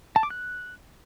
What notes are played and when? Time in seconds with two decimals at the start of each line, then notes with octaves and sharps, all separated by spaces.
0.16 A5
0.23 D6
0.30 F#6